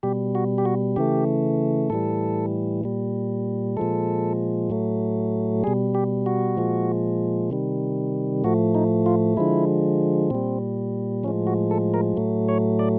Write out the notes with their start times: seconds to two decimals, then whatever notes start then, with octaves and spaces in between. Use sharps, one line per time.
0.03 B2 G3 G4
0.35 F#4
0.58 G4
0.65 F#4
0.96 C#3 E3 A3 G4
1.90 A2 E3 G3 A4
2.84 A#2 G3
3.77 A#2 F3 G#3 A4
4.70 A2 F#3 A3
5.64 B2 G3 G#4
5.95 G4
6.26 F#4
6.57 A#2 F3 G#3
7.50 C3 D#3 G3
8.44 A2 F3 A3 F#4
8.75 D#4
9.06 F4
9.37 D3 F3 G#3 E4
10.30 A#2 G3 C4
11.24 A2 F3 G#3 C#4
11.47 F#4
11.71 A4
11.94 A#4
12.17 A2 F#3 A3
12.49 C#5
12.79 D5